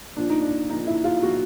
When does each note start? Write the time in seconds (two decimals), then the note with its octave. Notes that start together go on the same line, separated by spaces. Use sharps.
0.16 A#2 F3 D4
0.30 D#4
0.41 D4
0.69 A#2 F3 D#4
0.87 E4
1.04 F4
1.22 A#2 F3 F#4